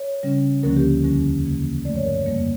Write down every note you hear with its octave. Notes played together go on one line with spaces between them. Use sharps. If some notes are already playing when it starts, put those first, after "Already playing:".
Already playing: C#5
C#3 G3 C#4
D2 D3 F3 A#3 C#4 A#4
G4
E2 D3 G3 C#4 A#4
C#3 E3 A#3
G2 F3 A3 D5
C#5
A#4
C#5
F2 C#3 G3 A#3